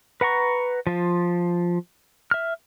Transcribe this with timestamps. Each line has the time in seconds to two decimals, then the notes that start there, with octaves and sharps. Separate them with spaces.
0.21 B4 F#5 A#5 C#6
0.87 F3 F4
2.31 E5 F6